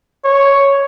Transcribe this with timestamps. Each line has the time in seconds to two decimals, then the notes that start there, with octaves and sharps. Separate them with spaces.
0.24 C#5